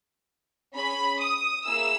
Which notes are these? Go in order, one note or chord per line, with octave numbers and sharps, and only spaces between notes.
C#4 G#4 B5
D#6
A#3 E4 G#4 E6